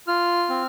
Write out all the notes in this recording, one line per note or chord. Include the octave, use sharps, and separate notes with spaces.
F4 F6
C4